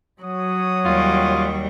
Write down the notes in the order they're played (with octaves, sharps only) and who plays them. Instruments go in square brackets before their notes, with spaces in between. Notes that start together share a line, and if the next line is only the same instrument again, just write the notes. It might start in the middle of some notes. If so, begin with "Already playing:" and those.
[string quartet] F#3 F#4 [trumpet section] C#5 D#6
[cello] D#2 G3 [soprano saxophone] F4